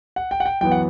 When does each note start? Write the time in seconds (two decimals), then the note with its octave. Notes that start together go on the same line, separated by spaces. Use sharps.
0.16 F#5
0.31 G5
0.40 F#5
0.46 G5
0.61 F#2 E3 B3 G5
0.72 F#5